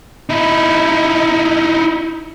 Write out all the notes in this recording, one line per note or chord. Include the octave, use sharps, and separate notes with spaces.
D#4 E4